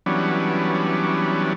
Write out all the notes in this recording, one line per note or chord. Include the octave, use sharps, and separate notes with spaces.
E3 F#3 G3 B3 C#4 D4